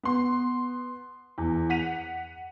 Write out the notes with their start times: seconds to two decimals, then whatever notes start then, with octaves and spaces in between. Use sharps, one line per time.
0.03 B3 C6
1.38 E2
1.70 F#5 B6 D#7 F7